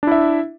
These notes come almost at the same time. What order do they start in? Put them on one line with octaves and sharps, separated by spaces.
D4 E4 E5